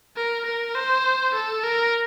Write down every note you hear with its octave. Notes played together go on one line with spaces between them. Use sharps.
A#4
A#4
C5
A4
A#4